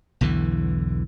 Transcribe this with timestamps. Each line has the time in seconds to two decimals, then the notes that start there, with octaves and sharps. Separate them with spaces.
0.21 B1 E2 D3 E3